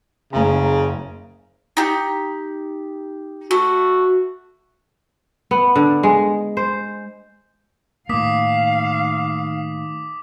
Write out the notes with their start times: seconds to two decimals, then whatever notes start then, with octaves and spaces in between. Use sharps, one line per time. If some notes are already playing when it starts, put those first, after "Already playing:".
0.33 F#1 C#3 A#5
1.77 D#4 G4
3.51 A3 F#4
5.51 B3
5.76 D3
6.03 G#3
6.57 C5
8.09 A2 D#3 A#3 F5 D6 D#6 B6